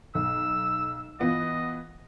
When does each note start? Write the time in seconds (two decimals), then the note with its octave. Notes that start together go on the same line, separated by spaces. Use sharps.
0.15 B1 E6
1.20 E3 B3 F4 D#5